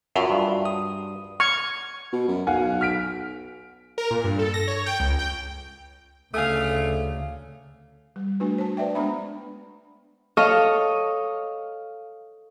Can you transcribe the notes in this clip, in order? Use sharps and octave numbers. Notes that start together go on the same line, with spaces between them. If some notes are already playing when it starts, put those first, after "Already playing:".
F#2 F4 F#4 E5
G2
D#6
C#6 F6 G#6
B2
F#2
B1 F5 F#5 G#5
F6 B6 D7
A#4
A#2
G2
A4
A#6
C#5
G5
C#2
G5
D2 C#3 A3 F5 G#5 D#6
G3
A3 D4 F#4 B4
C5 A5
B4 D5 E5 G5
G#3 B3 D4 A#5 B5
A4 C#5 D#5 F5